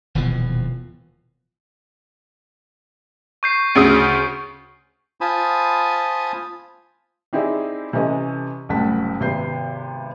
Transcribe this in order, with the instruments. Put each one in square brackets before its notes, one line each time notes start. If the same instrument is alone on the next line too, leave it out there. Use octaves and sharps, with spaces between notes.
[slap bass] D#1 B2 E3 F3
[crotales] C#6 G6 C7
[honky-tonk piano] D2 C#3 D#6
[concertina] F4 C5 G#5 A5 B5 D#6
[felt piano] C4 D#4 E4 G4 G#4 D5
C3 E3 C#4 A4 D#5
F#1 C2 A2 F#5 A5 B6
G#1 C3 B3 G6 C7